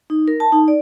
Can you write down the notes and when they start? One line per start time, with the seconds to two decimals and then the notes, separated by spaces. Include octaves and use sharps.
0.10 D#4
0.28 A#4
0.40 A5
0.52 D#4
0.68 D5